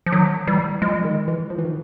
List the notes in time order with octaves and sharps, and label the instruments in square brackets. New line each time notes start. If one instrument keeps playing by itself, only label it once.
[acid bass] F3
[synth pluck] D#3 [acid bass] F#3
[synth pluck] E3 [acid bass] G3
[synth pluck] F3 [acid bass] G#3
[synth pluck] D#3
E3
F3
E3
D#3